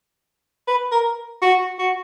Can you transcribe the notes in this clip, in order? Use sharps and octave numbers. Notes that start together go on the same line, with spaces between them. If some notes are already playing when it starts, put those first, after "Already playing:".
B4
A#4
F#4
F#4